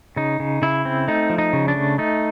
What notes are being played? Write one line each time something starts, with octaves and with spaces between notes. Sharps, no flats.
C#3 D#4
C#3
C#3 E4
C4
A3 D#4
F3
D#4
C#3
D4
A3
A3 D#4